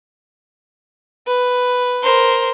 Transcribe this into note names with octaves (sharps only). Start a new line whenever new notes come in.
B4
A#4 C5